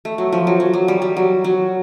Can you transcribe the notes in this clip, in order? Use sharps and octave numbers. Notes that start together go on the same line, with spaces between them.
A3
F#3
F3
F#3
F#3
F#3
G3
G3
F#3
F#3